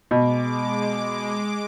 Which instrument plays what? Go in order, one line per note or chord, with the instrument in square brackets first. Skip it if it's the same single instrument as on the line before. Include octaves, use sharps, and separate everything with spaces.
[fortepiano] B2 [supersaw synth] G#3 D6